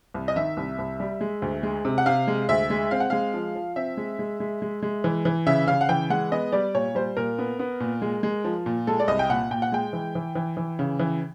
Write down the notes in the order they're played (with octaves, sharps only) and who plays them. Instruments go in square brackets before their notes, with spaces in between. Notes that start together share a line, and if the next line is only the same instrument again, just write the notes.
[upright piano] C2
D#5
D#3 E5
C2
C2
G3
G#3
D2
G#3
C3
F#5
C3 F5
G#3
D2 E5
G#3
C4 F5
F#5
G#3 F5
F3
F3
C4 E5
G#3
G#3
G#3
G#3
G#3
E3
E3
C#3 E5
C#3 F5
F#5
E3 G5
G#3 F#5
B3 D#5
G3 D5
A#2 C#5
G3 C5
A#2 A#4
B3
B3
A#2
G#3
G#3
F3
A#2
G#3 A4
D5
C2 D#5
G5
A#2 F#5
A#2 G5
F#5
G#3 G5
E3
E3
E3
E3
C#3
E3